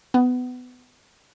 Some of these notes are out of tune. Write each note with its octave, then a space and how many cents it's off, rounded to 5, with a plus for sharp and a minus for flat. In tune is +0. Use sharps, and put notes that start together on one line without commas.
B3 +20